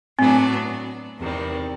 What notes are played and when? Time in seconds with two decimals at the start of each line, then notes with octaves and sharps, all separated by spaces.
0.19 A2 F#3 B3 C4 D4
1.18 E2 C3 D#3 G3